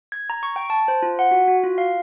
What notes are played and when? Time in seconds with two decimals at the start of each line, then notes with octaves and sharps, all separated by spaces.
0.12 G#6
0.30 A#5
0.43 C#6
0.56 G5
0.70 A5
0.88 C5
1.03 F4
1.19 F#5
1.31 F#4
1.48 F#4
1.64 F4
1.78 F5